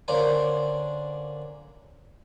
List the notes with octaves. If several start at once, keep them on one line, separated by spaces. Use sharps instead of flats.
D3 A#3 C#4 D4 C5